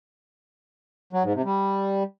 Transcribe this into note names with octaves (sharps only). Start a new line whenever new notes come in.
F#3
G#2
C3
G3